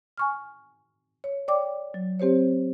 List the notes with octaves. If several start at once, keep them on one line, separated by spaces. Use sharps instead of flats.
G#5 C#6 F6
C#5
C#5 D5 G5 D6
F#3
C4 G4 C5 C#5